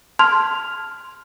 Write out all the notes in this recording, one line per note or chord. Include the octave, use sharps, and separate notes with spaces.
A5 C6 F6 G#6 F7